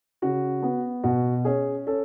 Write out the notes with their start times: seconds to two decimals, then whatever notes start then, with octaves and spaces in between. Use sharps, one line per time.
0.22 C#3 F#4
0.62 B3
1.04 B2 F#4
1.45 C#4 G#4
1.87 C#4 A4